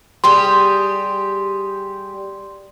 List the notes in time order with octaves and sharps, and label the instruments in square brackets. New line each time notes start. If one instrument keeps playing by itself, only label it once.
[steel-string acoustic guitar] G3 G4 G#4 [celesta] C6